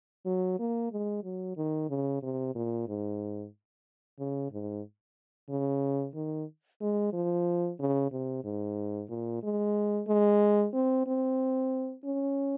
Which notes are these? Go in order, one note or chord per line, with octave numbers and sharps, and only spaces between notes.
F#3
A#3
G#3
F#3
D#3
C#3
C3
A#2
G#2
C#3
G#2
C#3
D#3
G#3
F3
C#3
C3
G#2
A#2
G#3
G#3
C4
C4
C#4